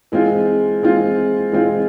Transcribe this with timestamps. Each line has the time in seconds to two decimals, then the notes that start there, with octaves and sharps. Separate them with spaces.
0.12 E3 G#3 C4 F4
0.82 E3 G#3 C4 F4
1.52 E3 G#3 C4 F4